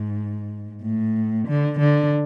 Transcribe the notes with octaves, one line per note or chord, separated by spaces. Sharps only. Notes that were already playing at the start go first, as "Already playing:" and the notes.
Already playing: G#2
A2
D3
D3